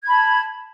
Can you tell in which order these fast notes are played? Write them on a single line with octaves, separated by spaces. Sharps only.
G#6 B5 A5